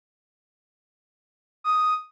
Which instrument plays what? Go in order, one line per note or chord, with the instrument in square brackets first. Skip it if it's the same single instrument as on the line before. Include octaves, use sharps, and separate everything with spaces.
[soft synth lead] D#6